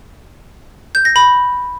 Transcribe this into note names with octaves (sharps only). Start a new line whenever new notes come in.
G6
A#6
B5